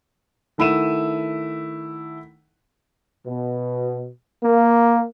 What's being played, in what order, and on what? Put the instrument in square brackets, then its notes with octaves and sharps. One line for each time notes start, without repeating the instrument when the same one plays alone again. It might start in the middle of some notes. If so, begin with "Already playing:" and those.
[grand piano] D#3 A3 E4 F#5 D#7 E7
[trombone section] B2
A#3